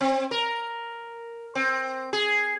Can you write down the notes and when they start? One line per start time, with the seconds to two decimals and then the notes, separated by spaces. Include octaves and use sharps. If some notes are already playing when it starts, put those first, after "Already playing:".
0.01 C4
0.31 A#4
1.55 C4
2.13 G#4